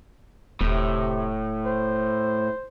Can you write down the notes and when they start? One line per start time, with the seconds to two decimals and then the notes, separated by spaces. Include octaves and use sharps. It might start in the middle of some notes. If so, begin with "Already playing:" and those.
0.61 D#1 A2 C3
1.65 C5